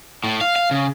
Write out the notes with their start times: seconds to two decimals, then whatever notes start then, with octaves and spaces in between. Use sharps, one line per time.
0.24 A2
0.41 F5
0.56 F5
0.71 C#3